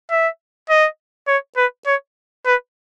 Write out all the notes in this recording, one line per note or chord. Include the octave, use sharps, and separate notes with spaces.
E5
D#5
C#5
B4
C#5
B4